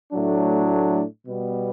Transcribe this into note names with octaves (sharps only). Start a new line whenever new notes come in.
A2 F#3 A3 D4
B2 G3 B3